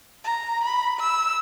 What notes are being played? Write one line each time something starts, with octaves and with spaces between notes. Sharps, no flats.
A#5
B5
E6